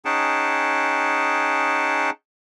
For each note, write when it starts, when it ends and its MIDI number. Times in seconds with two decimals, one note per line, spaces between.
0.05 2.10 61
0.05 2.10 63
0.05 2.10 68
0.05 2.10 78
0.05 2.10 79
0.05 2.10 81